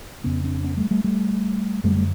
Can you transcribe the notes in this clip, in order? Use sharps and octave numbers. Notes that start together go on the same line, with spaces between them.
F2 C#3 B3 C#4
C4 D4
B3 C#4
G3 A3
G3 A3
G3 A3
F#2 D3 G3 A3
A3